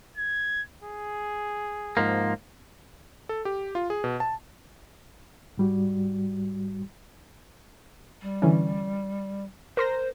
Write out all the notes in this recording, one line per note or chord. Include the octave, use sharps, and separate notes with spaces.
G#6
G#4
G#2 F3 A#3
A4
G4
F4
G#4
B2
A5
G#2 G3 F#4
G3
D3 E3 C#4
A#4 C5 C6 A#6